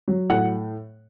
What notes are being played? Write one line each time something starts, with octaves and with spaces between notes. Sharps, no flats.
F#3
A2 F#5